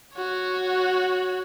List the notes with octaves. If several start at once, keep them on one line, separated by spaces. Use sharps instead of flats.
F#4 C#5